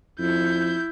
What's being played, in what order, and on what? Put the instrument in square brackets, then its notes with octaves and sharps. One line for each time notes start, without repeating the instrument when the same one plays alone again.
[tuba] F2 [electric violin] E4 G6